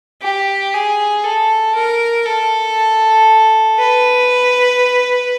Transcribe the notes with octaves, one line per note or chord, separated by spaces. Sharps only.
G4
G#4
A4
A#4
A4
B4